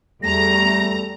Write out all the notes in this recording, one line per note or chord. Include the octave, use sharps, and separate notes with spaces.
E2 G3 A3 A#5 A#6